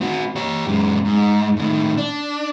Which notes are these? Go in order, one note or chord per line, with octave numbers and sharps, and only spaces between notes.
C4 F#4
G4 C#5
F#2 G#3
G#2
A2 D#3
D4